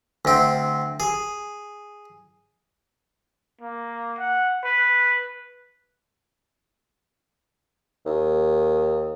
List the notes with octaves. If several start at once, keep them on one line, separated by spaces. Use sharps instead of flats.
D2 C4
G#4
A#3
F#5
B4
D#2